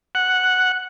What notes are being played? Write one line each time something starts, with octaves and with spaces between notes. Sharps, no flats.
F#5